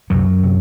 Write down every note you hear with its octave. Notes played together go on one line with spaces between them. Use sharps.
C2 F#2 C3 F#3
C3